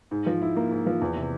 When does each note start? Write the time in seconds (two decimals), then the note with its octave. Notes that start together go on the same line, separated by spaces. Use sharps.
0.11 G#2
0.26 F3
0.41 E4
0.56 A#3
0.71 G#2
0.86 F3
1.01 E2
1.16 C3